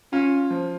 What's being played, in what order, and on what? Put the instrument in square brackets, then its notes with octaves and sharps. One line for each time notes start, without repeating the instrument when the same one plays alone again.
[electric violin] C#4 [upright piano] F4
[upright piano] F3